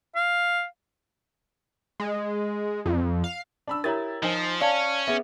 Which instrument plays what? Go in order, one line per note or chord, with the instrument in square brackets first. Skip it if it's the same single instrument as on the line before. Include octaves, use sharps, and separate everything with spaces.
[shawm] F5
[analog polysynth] G#3
F2
F5
[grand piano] D4 B5 E6
[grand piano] E4 G4 A6 [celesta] A#4 C#5 A#5
[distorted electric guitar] F3 [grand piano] D#4 C5 G#5
[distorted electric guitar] C#4 [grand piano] C#5 [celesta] D5 F5 A5
[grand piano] B3 [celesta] G#4 E5